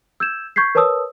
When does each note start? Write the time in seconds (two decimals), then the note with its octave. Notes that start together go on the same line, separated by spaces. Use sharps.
0.20 E6 G6 G#6 E7
0.56 C#6 G6 G#6 B6 C7
0.75 A#4 B4 C#5 A5 D#6 E6